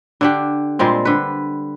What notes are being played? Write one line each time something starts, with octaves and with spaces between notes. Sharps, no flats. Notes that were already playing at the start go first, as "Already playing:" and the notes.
D3 D4 G4
A#2 G3 G#3 C4
D3 B4